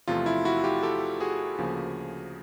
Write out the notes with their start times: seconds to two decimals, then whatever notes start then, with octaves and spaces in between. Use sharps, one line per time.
0.08 E2 C3 F3 A3 F4
0.26 E4
0.45 E4 F#4
0.64 F4 G4
0.83 G4 A4
1.20 F#4 G#4
1.58 D2 C#3 F3 A#3